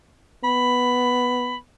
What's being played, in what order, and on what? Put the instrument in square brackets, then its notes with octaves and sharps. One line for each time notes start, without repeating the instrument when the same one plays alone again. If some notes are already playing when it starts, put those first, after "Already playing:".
[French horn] B3 [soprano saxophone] B5